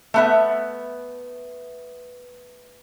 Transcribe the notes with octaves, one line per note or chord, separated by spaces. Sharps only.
A3 B3 E5